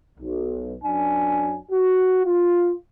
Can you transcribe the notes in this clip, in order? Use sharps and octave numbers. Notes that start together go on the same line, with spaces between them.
B1
F#2 F#3 D4 G#5
F#4
F4